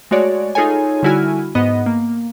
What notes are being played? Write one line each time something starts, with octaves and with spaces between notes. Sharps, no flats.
G#3 A3 F#4 C#5 D5
D#4 F4 G#4 A4 C#5 G#5
D3 G3 E4 F#4 G#5 F6
G#2 B3 D#5
A#3